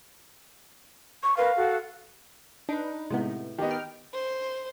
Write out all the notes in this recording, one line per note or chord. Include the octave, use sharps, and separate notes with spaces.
C#6
A#4 B4 F5
F#4 A4
D4 D#4 B4
A2 C3 G#3 B3
D#3 B3 G4 D#5
G5 F6
C5